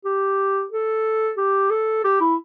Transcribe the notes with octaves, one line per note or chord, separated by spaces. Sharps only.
G4
A4
G4
A4
G4
E4